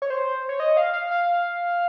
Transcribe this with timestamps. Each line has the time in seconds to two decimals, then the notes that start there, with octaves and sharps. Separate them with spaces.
0.02 C#5
0.10 C5
0.49 C#5
0.60 D#5
0.77 F5
0.93 F5
1.11 F5